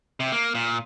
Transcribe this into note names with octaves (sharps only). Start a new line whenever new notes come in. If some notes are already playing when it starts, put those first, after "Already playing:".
C3
A#3
A#2